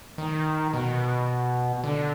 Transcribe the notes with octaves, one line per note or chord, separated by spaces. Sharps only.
D#3
B2
D3